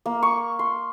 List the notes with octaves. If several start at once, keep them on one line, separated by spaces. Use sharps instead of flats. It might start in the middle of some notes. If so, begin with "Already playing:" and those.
A#3
C#6
C6